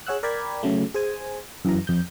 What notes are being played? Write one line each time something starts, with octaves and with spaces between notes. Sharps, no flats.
G#4 C#5 F#5 E6 F#6
A#4 D5 G5 B5 G#6
C#3 F#3 A3
G#4 C5 G#5
F#2 E3 A#5
F2 G6